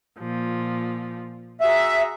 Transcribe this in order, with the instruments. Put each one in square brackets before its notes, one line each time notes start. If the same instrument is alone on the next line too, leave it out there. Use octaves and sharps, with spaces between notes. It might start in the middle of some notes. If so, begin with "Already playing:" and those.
[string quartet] A#2 F3
[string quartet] F#4 G#4 A#5 [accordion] E5